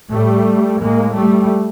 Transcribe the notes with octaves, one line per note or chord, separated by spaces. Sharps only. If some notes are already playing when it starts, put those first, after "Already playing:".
A2 G3 A3
A2 G#3 A#3
G3 A3